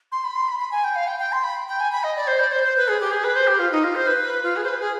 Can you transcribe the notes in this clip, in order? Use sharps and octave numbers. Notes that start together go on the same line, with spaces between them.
C6
B5
C6
B5
B5
G#5
G5
F5
G5
G5
C6
B5
G5
G#5
B5
D#5
D5
C5
D5
C5
C5
B4
G#4
G4
G#4
B4
C5
G4
F4
D#4
F4
C5
B4
F4
G#4
C5
B4
G#4